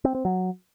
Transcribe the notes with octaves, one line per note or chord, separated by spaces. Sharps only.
C4
C4
F#3